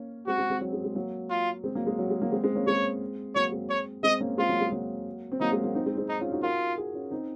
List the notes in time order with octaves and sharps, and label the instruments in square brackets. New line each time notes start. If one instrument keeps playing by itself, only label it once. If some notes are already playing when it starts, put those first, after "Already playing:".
Already playing: [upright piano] A#3 C#4
[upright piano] G#3 C4 [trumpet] F#4
[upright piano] G#3 C4
G#3 C4
F#3
G#3
G#3
F#3 A#3
[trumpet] F4
[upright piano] G#3 C4
F#3 A#3
G#3
F#3
G#3
F#3 A#3
G#3 C4
G#3 C4
A#3 C#4
[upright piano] G#3 C4 [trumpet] C#5
[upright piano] F#3 A#3 [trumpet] C#5
[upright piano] G#3 C4
[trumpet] C#5
[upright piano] G#3 C4 [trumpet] D#5
[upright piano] A#3 C#4
[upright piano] G#3 C4 [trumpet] F4
[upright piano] F#3 A#3
G#3
F#3 A#3
C4
[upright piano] F#3 A#3 [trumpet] D#4
[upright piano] G#3
F#3 A#3
C4 D#4
G#3 C4
G#3 C4
[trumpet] D#4
[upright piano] C#4 F4
D#4 F#4
[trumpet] F4 [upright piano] F#4 A#4
[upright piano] F4 G#4
C#4 F4
C4 D#4